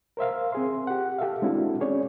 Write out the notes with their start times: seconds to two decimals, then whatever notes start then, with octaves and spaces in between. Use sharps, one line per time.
0.17 A#4 C5 E5 F5
0.52 C4 G#4 C6
0.87 G4 F#5
1.18 G4 A4 E5 F5
1.42 G#3 C4 D4 E4 F#4 A4
1.80 C#4 G#4 C#5 D5